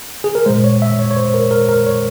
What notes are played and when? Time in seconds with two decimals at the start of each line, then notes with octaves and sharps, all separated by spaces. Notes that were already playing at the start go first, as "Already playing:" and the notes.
0.24 G#4
0.35 A#4
0.46 G#3 C5
0.49 A#2
0.64 C#5
0.82 E5
0.99 C#5
1.11 C#5
1.16 C5
1.34 A#4
1.51 A#4
1.69 A#4
1.86 C#5